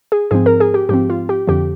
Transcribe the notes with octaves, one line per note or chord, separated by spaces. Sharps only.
G#4
G#2 F3 C4 G#4
A#4
G#4
G4
G#2 F3 C4 G4
F4
G4
F2 D3 F3 G4